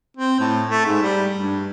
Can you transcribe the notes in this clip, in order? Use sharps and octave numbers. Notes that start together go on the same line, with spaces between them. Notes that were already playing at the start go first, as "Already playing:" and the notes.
C4
A2
A3
G#2
G3
G2